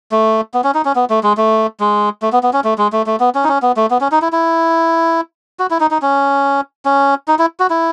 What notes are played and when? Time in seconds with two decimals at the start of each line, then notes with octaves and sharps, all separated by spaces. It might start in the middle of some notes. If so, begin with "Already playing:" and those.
0.12 A3
0.54 B3
0.64 C#4
0.74 D#4
0.85 C#4
0.95 B3
1.10 A3
1.23 G#3
1.37 A3
1.80 G#3
2.22 A3
2.32 B3
2.43 B3
2.53 C#4
2.64 A3
2.78 G#3
2.92 A3
3.06 A3
3.20 B3
3.35 C#4
3.44 D#4
3.49 C#4
3.62 B3
3.76 A3
3.90 B3
4.01 C#4
4.12 D#4
4.22 E4
4.32 E4
5.59 F#4
5.70 E4
5.80 D#4
5.91 D#4
6.02 C#4
6.85 C#4
7.28 D#4
7.39 E4
7.60 F#4
7.70 E4